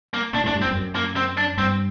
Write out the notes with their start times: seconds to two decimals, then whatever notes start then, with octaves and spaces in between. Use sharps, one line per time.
0.14 A#3
0.33 A#2 D4
0.44 A2 D4
0.55 G2
0.62 C4
0.65 F#2
0.76 F#2
0.95 A#3
1.16 C4
1.37 D4
1.57 G2 C4